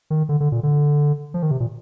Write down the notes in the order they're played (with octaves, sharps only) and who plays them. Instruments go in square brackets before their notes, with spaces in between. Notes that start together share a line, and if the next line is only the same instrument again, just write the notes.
[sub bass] D#3
D3
D3
A#2
D3
F3
D#3
C3
A#2